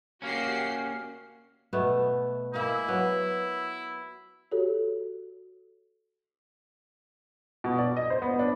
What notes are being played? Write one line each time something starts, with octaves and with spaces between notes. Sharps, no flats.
A#3 C#4 F#4 G4 C7
B2 A3 B3
G#3 A#3 E4
F#3 B3
F#4 G4 A4 C#5
B2
D5
D#5
C5
B3
D4